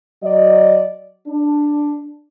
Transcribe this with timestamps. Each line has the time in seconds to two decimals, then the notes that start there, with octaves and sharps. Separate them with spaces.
0.23 F#3 D5 D#5
1.27 D4